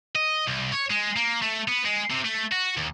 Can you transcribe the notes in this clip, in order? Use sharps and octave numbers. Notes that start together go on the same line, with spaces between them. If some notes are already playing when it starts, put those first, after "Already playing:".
D#5
C2
C#5
G#3
A#3
A3
B3
G#3
C3
A3
F#4
D#2